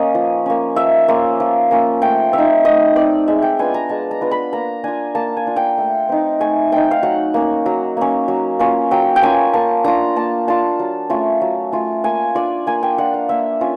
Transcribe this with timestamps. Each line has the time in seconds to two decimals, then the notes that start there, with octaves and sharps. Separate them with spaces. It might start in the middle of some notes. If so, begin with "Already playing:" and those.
Already playing: A#3 C#4 D#5
0.15 F3
0.46 A#3 C#4
0.76 F3 E5
1.08 A#3 C#4 F4
1.40 F3
1.71 A#3 C#4 F4
2.02 A3 G5
2.33 C4 E5
2.38 D#4
2.65 A3 D#5
2.96 C4 D#4 D5
3.28 G#3 E5
3.42 G5
3.59 B3 D4 F4 G#5
3.74 A#5
3.89 G#3 A5
4.11 A#5
4.21 B3 D4 F4
4.31 B5
4.53 A#3 A#5
4.84 D4 F4 G#5
5.15 A#3 A5
5.37 G#5
5.47 D4 F4
5.56 G5
5.78 A3
6.09 C4 D#4
6.40 A3 G#5
6.72 C4 D#4 G5
6.91 F5
7.03 F#3 F#5
7.34 A#3 C#4
7.66 F#3
7.97 A#3 C#4
8.28 F#3
8.59 A#3 C#4 F4
8.91 F#3 G5
9.16 G5
9.22 A#3 C#4 F4 G#5
9.53 A#3 A5
9.84 D4 F4 A#5
10.16 A#3 A5
10.48 D4 F4 A5
10.80 F#3
11.10 A3 C#4 F4
11.41 F#3
11.72 A3 C#4 F4
12.04 A#3 G#5
12.35 D4 F4 D5
12.67 A#3 G#5
12.83 G5
12.98 D4 F4 F#5
13.14 F5
13.29 A#3 E5
13.61 C#4 F4